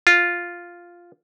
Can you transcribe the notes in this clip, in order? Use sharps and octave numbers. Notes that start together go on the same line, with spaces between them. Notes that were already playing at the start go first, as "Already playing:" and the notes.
F4